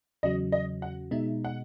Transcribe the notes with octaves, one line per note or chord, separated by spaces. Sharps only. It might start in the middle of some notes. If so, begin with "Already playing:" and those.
E2 C#3 F#3 D#5
D#5
F#5
B2 G#3 D#4 E5
F#5